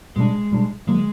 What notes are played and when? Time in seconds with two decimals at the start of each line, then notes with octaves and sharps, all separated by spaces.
0.16 B2 G3 G#3 A#3 D4
0.51 B2 G3 A#3 D4
0.87 D3 F#3 G#3 A#3